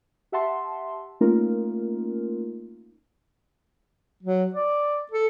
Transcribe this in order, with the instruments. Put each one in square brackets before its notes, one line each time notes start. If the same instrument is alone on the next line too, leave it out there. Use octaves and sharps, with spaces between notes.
[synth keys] G4 E5 F#5 A5 C6
A3 A#3 C#4 D#4 F4 A#4
[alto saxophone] F#3
D5
A4